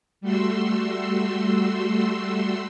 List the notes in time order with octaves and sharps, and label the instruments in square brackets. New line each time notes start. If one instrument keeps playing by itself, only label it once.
[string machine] G3 A3 F#4 C6 E6